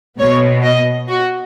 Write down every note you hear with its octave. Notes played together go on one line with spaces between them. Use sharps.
B2 B3 C#5
D#5
F#4